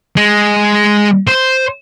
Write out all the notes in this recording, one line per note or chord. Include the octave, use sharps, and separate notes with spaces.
G#3
C5